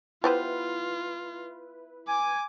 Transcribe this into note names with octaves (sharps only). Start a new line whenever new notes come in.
B3 E4 F4 G4 B4 C5
G#5 D6